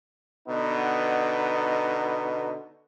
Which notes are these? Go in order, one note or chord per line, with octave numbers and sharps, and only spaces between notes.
B2 D3 B3 D#4